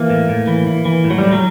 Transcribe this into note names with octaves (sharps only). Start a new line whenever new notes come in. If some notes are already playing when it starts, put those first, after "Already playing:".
Already playing: E3 A#3
A2
A2
E3
E3
E3
A2
F#3
G3
A2
F#3